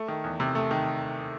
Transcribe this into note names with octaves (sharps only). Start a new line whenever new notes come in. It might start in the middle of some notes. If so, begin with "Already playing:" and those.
Already playing: A3
D#3
E2
C3
A3
D#3